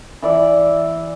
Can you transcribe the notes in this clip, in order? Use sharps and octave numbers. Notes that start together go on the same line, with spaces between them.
E3 D5 E5